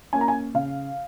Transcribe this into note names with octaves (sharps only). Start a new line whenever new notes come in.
A#3 C#4 G#5
A#5
G#5
C#3 F5